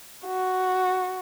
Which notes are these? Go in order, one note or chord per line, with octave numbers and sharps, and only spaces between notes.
F#4